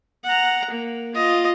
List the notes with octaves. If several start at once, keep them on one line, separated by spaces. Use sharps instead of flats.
F#5 A#5
A#3
F4 D#5